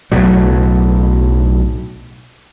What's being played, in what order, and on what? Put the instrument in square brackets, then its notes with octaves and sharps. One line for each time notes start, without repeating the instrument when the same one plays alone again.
[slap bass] B1 A2 F#3